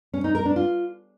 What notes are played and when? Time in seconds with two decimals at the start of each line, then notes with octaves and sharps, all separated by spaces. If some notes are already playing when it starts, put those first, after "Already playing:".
0.14 C#4
0.24 D#4
0.35 A#4
0.45 D4
0.56 F4